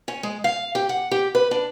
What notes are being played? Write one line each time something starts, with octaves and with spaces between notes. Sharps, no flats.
C#4
G#3
F5
G4
F#5
G4
B4
D4